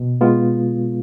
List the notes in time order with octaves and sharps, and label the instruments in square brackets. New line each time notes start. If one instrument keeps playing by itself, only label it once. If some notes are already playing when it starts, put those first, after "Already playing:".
Already playing: [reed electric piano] B2
G#3 B3 F4